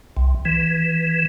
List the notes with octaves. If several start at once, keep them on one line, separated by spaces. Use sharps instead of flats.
C2
E3